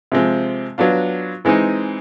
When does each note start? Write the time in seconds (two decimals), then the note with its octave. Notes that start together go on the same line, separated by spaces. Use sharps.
0.12 C3 F3 G#3 C4
0.78 F#3 B3 D4 F4
1.45 E3 G#3 C4 D#4